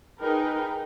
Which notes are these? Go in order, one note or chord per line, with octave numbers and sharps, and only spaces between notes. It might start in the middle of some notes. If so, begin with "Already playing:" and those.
D#4 G#4 A#4 B4 G5